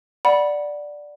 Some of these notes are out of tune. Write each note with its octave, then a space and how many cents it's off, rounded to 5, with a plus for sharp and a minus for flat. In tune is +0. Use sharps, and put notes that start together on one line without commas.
D5 +0 F#5 +0 B5 -15